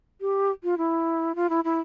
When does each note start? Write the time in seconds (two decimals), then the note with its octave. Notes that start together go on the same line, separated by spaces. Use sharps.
0.21 G4
0.64 F4
0.78 E4
1.35 F4
1.50 E4
1.64 E4